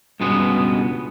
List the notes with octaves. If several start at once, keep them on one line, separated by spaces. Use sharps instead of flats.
C#2 G2 B2 G#3 B3